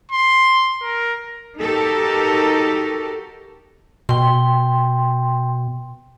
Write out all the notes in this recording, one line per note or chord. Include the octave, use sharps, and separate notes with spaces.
C6
A#4
D#4 F#4 G4 A4 A#4
B2 G5 C6